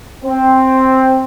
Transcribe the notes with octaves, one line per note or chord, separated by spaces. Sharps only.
C4